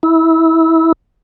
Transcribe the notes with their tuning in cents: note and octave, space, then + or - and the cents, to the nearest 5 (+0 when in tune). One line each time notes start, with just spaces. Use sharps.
E4 -20